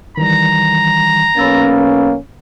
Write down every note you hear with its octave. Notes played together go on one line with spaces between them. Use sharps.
D#3 E3 G3 A#5
B1 A#3 C#4 B5 E6 A6